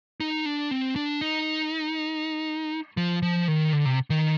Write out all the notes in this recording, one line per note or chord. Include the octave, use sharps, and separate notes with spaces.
D#4
D4
C4
D4
D#4
F3
F3
D#3
D3
C3
D#3